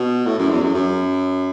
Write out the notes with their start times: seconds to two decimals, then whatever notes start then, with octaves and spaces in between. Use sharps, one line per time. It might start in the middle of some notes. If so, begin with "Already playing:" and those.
Already playing: B2
0.26 A2
0.39 F#2
0.50 E2
0.62 F#2
0.74 F#2